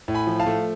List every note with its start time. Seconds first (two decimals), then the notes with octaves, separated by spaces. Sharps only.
0.08 A2
0.14 G#5 B5
0.27 F3
0.40 F5 A5
0.46 A3